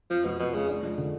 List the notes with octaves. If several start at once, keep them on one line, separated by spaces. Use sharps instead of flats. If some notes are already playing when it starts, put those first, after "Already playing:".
F2 F3
B2 F3
F2 B2
C#3 G#3
D4
F3
D3